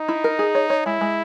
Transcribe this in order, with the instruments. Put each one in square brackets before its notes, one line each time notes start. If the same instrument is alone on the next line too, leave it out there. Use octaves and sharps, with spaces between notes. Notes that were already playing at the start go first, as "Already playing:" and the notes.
Already playing: [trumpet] D#4
[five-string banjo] E4
A#4
G#4
C#5
C#5
[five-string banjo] G#3 [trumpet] E4
[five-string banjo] G#3